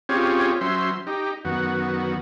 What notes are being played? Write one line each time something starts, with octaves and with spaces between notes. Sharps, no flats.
C4 C#4 F4 G4 G#4 C#5
F#3 C#4 C5 E5 C6
D#4 G4
F#2 D#3 B3 F#4